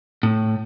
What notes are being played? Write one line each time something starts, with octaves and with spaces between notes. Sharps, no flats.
A2